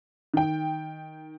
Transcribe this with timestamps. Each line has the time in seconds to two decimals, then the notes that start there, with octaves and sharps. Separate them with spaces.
0.34 D#3 G5